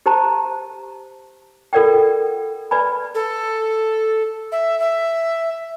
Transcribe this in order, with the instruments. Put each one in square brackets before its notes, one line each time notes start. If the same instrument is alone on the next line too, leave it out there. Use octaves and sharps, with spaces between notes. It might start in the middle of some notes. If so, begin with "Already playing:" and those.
[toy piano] G4 C5 A5 A#5
F4 A4 A#4 D5 F#5 G5
B4 D5 G#5 B5
[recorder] A4
E5
E5